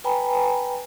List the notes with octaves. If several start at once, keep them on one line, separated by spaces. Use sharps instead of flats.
B4 G5 G#5 A#5 B5